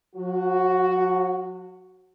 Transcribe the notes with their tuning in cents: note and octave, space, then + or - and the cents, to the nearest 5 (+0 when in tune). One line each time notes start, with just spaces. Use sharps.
F#3 -45 F#4 +5